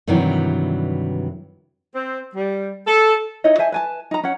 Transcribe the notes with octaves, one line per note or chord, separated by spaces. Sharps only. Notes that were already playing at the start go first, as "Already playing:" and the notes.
G2 C3 D#3 E3 F#3 G3
C4
G3
A4
D#4 E4 C#5 D#5
C5 E5 G#5 A5
B4 G#5 A5
D#4 A#5
C#4 C#5 F#5